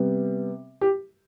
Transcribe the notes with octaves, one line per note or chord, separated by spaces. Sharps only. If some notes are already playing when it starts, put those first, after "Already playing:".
Already playing: C3 G3 B3
G4